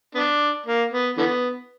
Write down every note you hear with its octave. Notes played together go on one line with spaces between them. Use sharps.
B3 D4
A#3
B3
D3 E3 B3